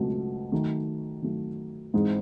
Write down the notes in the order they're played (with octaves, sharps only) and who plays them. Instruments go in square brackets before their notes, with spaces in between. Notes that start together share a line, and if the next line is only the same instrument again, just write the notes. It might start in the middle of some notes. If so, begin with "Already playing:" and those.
Already playing: [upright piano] C#2 B2 F#3 A3
D#3 F#3 A3
D#3 F#3 A3
G#2 E3 G#3 C4